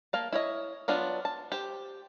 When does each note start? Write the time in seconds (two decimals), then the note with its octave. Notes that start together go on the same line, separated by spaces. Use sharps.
0.13 A#3 F5 A5
0.33 E4 C#5 D#5
0.88 F#3 B3 D4 F4
1.25 A5
1.52 G4 C5